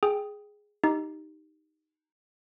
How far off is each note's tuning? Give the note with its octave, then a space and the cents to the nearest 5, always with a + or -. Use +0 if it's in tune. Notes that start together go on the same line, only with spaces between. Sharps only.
G#4 +0 G5 +0
D#4 +0 G4 -5